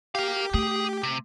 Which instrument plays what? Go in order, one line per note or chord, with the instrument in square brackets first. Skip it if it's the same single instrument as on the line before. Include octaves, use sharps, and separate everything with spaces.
[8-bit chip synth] G4 [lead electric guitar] A#4 F5
[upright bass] A3 [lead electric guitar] G#4
[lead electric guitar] C3